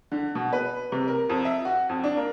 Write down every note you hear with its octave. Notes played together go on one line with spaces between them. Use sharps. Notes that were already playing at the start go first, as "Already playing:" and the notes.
D3
B2
B4
C3
A#4
F2
E5
F#4
F2
D4
A#3